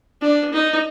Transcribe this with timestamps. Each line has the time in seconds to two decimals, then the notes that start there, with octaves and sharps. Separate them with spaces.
0.22 D4
0.53 D#4